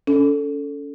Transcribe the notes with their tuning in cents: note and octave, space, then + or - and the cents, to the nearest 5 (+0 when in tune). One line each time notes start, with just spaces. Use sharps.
C#4 +30 A4 +0